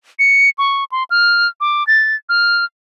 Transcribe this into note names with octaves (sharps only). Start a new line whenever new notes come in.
C#7
C#6
C6
F6
D6
A6
F6